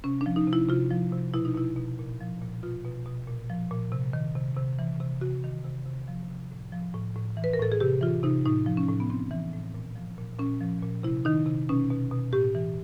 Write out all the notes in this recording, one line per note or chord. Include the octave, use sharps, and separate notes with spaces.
C3 C#4
D4
F3
D#4
C3
E4
C3 F4
F3
C3
B2 E4
D#4
B2 E4
B2
A#2
F3
A#2
B2 F4
B2
B2
A#2
F3
A#2
C3
D#3
C3
C3
E3
C3
C3 F#4
D#3
C3
C3
F3
C3
A2
F3
A2
A2
E3
B4
A#4
A2 A4
G#4
C3 G4
E3 F4
C3 D#4
A2 D#4
F3
C#4
A2
B3
A2 C4
E3
A2
A#2
F3
A#2
A#2 C#4
F3
A#2
C3 E4
D#3 D#4
C3
B2 C#4
B2
B2
A2 G4
E3